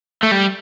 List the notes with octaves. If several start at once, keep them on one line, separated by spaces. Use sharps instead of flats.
A3
G3